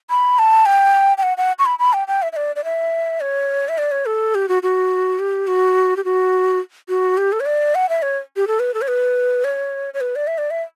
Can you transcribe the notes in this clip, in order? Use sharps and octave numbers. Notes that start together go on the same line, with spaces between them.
B5
A5
G5
G5
F#5
F#5
C#6
B5
B5
G5
G5
E5
E5
D5
D5
E5
C#5
E5
D5
C#5
A4
G4
F#4
F#4
G4
F#4
G4
F#4
F#4
G4
A4
C#5
D5
F#5
E5
C#5
G4
A4
B4
A4
C#5
B4
C#5
C#5
B4
D5
E5
D5
E5